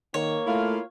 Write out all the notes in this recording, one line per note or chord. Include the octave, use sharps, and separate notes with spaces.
D#3 A#3 C#5
A3 E4 F4 F5